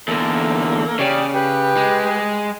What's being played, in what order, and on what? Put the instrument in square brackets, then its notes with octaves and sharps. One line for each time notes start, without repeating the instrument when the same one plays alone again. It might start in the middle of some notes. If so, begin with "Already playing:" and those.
[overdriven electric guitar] E2 D3 [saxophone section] A#3 A4 A#4
[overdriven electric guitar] C#3 [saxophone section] G4 C#5 D5
[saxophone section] G4 B4
[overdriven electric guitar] G#3